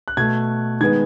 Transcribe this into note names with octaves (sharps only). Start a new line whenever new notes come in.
F#6
B2 A3 G#6
D#3 G#3 B3 G#6